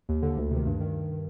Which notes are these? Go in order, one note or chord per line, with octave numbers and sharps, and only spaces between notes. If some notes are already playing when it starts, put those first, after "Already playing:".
D#2
D3
D2
C3 D#3
G2
D#3